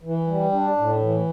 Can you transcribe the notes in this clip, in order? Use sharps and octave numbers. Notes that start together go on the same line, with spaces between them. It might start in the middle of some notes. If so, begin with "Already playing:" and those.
E3
G3
D4
A2
E3